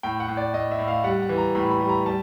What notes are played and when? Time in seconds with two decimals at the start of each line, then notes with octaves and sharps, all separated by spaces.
0.03 A2 G5
0.20 F#5
0.28 A2
0.37 D5
0.54 A2 D#5
0.72 E5
0.79 A2
0.88 F5
1.04 G3 F#5
1.22 F#5
1.29 E3
1.38 A#5
1.55 A2 B5
1.71 B5
1.80 G3
1.89 A#5
2.06 G3 A5